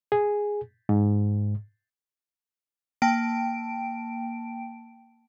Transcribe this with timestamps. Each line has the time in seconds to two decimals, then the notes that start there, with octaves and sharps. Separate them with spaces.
0.12 G#4
0.89 G#2
3.02 A#3 G5 A5 D7